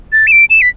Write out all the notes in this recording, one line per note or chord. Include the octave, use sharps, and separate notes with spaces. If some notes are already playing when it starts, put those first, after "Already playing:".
A6
E7
D7
E7
B6